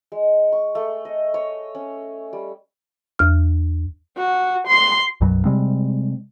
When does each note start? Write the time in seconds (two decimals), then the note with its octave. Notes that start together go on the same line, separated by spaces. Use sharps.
0.12 G#3
0.52 C#6
0.75 A3
1.05 D#5
1.34 C#5
1.75 C#4
2.33 G3
3.19 E2 F6
4.17 F#4
4.68 C6
5.21 B1 F#2 B2 F#3
5.45 C3 G3 G#3 C4